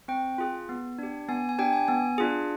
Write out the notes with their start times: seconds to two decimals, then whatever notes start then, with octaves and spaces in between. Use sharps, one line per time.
0.08 C4 G5
0.38 F4 G#4
0.69 B3
0.99 D4 G4
1.29 B3 G#5
1.49 G#5
1.59 D4 G4 G5
1.73 G#5
1.88 B3 G#5
2.18 D4 F4 G#4